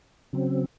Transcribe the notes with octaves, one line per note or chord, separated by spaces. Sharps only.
C#3 F#3 C4